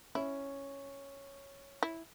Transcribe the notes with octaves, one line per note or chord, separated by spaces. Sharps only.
C#4 E4
E4